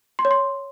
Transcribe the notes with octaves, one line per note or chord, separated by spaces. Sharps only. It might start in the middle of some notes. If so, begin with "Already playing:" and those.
C6
C#5
C6